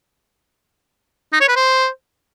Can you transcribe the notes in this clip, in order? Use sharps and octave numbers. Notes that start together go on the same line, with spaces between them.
D#4
C#5
B4
C5